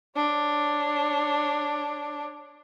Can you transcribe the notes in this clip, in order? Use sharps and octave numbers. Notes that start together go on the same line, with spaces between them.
D4 C#5